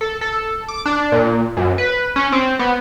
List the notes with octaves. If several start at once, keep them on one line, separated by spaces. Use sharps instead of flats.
A4
A4
D6
D4
A#2
F#2
B4
C#4
C4
B3